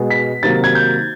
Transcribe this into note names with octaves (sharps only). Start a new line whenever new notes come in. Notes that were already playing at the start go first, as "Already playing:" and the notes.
Already playing: B2 G#3 B3
B6
C3 D#3 F#3 A#3 A6
G#6
G6